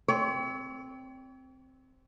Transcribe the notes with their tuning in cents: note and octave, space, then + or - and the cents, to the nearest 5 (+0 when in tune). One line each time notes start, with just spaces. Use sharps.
C4 +0 C#5 +40